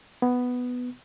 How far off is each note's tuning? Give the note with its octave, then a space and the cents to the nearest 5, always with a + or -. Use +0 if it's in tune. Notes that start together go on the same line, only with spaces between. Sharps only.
B3 +5